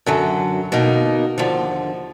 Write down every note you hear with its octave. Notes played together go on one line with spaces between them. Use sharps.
F#2 D3 F#3
B2 A#3 D#4
D#2 D3 F3